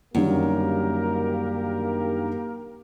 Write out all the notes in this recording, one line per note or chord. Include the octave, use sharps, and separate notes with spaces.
F#2 D3 D#3 G3 A#3 G4 A#4